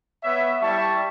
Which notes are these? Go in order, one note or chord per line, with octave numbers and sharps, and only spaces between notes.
B3 C#5 E5
G3 E4 E5 A5 C#6